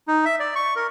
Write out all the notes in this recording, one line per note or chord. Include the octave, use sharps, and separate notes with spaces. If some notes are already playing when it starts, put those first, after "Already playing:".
D#4
E5
D5
C#6
A#4